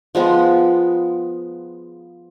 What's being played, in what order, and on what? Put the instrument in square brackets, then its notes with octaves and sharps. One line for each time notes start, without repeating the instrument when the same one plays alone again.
[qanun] F3 G#3 B3